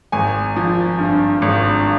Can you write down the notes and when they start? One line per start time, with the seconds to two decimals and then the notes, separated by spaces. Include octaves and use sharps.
0.12 G#1 G#5
0.56 F3
0.99 G2
1.42 G#1